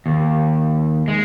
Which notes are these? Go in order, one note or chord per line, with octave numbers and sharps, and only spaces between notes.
D#2
G#3